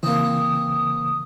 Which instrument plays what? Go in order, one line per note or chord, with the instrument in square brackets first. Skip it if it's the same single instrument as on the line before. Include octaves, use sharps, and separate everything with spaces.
[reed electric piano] C#3 E3 [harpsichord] A#3 C4 [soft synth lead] D#6